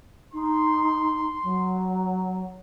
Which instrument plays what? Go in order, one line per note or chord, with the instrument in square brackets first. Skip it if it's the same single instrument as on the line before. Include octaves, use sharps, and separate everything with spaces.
[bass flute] D#4 [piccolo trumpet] C6
[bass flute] F#3